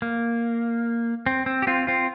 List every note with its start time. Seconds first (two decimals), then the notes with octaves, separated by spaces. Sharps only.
0.02 A#3
1.26 C4
1.46 C4
1.62 G4
1.67 C4 F4
1.87 C4 F4